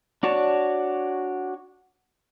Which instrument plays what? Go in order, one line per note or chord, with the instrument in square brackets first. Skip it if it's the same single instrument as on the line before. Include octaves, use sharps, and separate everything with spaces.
[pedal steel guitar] D4 F#4 C#5 D5 A5